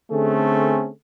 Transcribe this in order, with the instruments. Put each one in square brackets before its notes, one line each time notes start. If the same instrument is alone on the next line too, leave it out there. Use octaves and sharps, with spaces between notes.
[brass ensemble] D3 A3 C4 C#4 G#4 A4